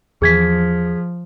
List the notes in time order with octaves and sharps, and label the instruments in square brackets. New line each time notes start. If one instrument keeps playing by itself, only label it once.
[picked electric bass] E2 E3 [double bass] F3 [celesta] G#4 G#6 B6